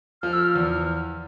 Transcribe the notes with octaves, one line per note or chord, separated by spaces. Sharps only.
F3 F6
E6
F6
E2